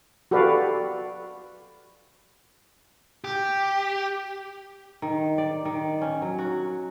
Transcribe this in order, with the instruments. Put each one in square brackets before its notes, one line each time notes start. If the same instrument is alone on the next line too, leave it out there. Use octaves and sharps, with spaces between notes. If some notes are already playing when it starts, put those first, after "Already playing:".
[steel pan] F#4 G4 A4 B4 D5 F5
[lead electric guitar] G4
[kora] D#3
D5
D#3
C#4
F#3
F#4